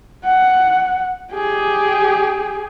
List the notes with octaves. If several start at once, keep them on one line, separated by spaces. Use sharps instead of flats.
F#5
G4 G#4